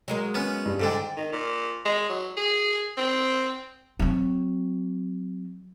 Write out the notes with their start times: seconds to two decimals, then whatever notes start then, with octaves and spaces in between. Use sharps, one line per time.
0.08 F#3 G#3 A#3
0.34 B3 C#4
0.66 G2
0.80 G#2 D3 D4 A4 G5
1.17 D#3
1.32 A#2
1.85 G#3
2.10 F#3
2.37 G#4
2.97 C4
3.99 F#3 C4